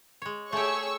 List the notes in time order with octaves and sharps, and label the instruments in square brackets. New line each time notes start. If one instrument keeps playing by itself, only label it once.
[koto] G#3 C#5
[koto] A3 G4 [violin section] G#4 C#5 [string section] C#6 E6